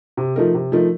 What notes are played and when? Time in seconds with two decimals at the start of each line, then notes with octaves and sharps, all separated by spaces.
0.17 C3
0.36 F3 A3 D#4 A#4
0.54 C3
0.72 F3 A3 D#4 A#4